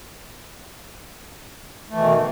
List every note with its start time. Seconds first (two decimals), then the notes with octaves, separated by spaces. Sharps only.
1.90 A3
1.94 E3
1.97 B2
2.00 D#3